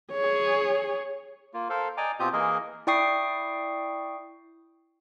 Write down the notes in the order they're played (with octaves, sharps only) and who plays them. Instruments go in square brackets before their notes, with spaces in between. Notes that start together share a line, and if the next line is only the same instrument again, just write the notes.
[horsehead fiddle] G#4 C#5
[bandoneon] A#3 F4
A4 A#4 C5 F5
D5 D#5 G5 G#5 A#5 D6
B2 C4 F4 G4 D#6 G6
E3 A#3 G#4 A#4 D#5
[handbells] E4 D5 G5 C#6 D#6 C7